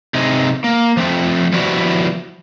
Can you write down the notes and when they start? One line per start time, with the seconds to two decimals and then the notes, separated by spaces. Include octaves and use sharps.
0.15 C3 C4 D#4 G#4
0.64 A#3
0.97 F3 A3 C4
1.53 F3 G3 B3 E4 F#4